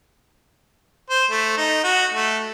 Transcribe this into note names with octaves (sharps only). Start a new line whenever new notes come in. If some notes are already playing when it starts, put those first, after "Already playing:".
C5
A3
D#4
F#4
A3